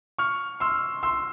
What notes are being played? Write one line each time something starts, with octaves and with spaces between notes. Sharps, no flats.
C#6 F6
C6 E6
C6 E6